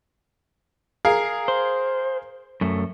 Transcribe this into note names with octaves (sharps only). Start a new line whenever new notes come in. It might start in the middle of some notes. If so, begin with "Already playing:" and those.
G#4 A#4 F5
C5
F#2 A3